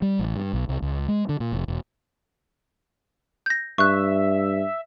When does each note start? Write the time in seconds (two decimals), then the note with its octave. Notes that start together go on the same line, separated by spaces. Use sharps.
0.02 G3
0.19 A1
0.36 G2
0.53 B1
0.69 C2
0.82 C#2
1.08 G#3
1.29 D3
1.40 A#2
1.52 F1
1.68 E1
3.46 G6 A#6
3.78 G2 E5 C#6 F#6